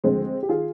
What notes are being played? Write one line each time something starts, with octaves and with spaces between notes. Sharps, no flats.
D2 D3 F3 G#3 C4
G4
D#3 F4 G#4